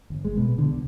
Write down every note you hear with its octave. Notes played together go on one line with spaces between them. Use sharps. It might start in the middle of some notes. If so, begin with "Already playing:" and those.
G1
G#3
B2
D3
C2